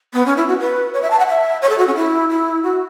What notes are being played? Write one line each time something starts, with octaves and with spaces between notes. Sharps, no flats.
B3
C#4
E4
F#4
B4
C#5
E5
A5
F#5
E5
C#5
A4
F#4
C#4
E4
E4
F#4